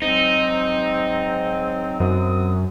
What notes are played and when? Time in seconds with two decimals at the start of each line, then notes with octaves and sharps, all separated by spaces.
0.02 G#2 F#3 C4 D#4
2.00 F#2 C4 D#6